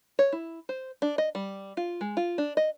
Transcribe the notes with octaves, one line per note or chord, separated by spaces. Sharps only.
C#5
E4
C5
D4
D#5
G3
F4
G#3
F4
D4
D#5